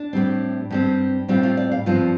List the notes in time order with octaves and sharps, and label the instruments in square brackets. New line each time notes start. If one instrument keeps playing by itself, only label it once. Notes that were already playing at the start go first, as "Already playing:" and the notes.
Already playing: [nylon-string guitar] D4
A2 G3 C4
G2 G3 C4
A2 G3 C4 F4
F4
D5
F5
G2 F3 C4 F4